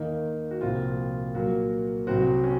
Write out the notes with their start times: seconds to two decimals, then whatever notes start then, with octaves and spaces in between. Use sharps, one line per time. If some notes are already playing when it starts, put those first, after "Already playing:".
Already playing: D#2 D#3 A#3 D#4
0.51 F#4
0.61 C2 A#2 F3 C4 F4
1.34 A#2 F#3 A#3 F#4
2.07 C2 C3 F#3 C4 F#4
2.43 C#4